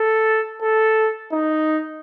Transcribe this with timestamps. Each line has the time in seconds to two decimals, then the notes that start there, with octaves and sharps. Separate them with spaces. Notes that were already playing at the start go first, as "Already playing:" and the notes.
Already playing: A4
0.61 A4
1.32 D#4